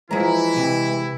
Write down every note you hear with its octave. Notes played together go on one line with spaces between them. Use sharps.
E3 F3 G#3 E4 A#5
C3